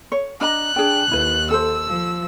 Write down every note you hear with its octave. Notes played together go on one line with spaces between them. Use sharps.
C#5
D4 D#5 A#5 F#6
D4 G#4 G5
D#2 E4 B4
A4 C5 E6
F3